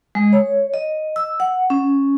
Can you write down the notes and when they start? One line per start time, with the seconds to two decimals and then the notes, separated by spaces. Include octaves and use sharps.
0.15 G#3
0.33 C#5
0.74 D#5
1.16 E6
1.40 F#5
1.70 C#4